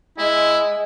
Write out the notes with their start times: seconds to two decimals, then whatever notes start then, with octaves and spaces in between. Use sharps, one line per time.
0.18 G#3 E4